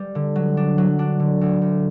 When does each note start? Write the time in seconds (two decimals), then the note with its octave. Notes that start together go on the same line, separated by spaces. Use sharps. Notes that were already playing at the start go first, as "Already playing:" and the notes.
Already playing: G3
0.15 D3
0.36 F#3
0.57 D4
0.78 F#3
0.99 D4
1.20 D3
1.41 D2
1.62 D2